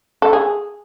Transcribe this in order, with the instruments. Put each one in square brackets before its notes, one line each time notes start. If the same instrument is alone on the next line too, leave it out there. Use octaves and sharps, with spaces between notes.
[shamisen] A4
G#4